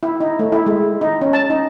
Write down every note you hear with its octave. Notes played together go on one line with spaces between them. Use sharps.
E4
D#4
A3
E4
G#3
D#4
C#4
A5
D#4